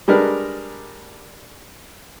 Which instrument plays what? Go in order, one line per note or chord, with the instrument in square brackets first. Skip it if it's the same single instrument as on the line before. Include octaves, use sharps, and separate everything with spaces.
[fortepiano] G3 G#3 D4 A#4 B4